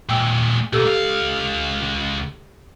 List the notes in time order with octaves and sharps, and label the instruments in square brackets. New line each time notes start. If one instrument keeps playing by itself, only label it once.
[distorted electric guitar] A#2 G#3 [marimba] G5 E6
[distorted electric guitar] B2 A#3 [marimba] G4 A4 E6
[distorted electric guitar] C#2 F5